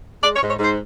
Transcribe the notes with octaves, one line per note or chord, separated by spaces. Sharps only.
G#3 D5
C#5
G#2
C#5
G#2 C5